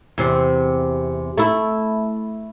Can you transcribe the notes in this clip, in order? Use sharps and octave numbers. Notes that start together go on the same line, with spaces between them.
E2 C3
A3 E4